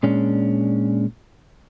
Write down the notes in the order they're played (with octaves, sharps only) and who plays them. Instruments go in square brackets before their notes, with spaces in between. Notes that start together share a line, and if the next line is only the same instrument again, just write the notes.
[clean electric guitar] A#2 G#3 C#4 D4